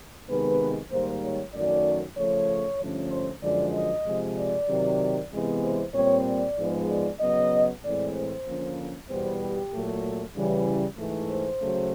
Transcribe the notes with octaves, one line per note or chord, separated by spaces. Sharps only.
C3 D#3 G#3 B3 B4
G#2 D#3 G3 A#3 C5
C#5
F#2 D#3 F#3 A3 C#4 D5
C#3 F3 A3 C#5
G2 D3 F3 A3 C#4
C5
F#2 D3 F3 G#3 D5
D#5
C3 F3 G#3
D5
C3 D#3 F#3
C3 E3 G#3 B3
C5
A#2 G3 C4 C#5
D5
G#2 F3 G#3 B3
D5
C#3 F#3 B3 D#5
A2 E3 G#3 C4 D5
C5
D3 F3 A#3 C#4
E2 B2 G3 B3 C5
G4
A#2 F#3 A3
C#3 E3 G3
G#2 E3 A3
C5
C#3 F#3 A3